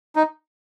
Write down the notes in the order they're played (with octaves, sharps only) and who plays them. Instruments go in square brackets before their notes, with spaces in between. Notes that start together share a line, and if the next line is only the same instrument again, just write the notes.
[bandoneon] D#4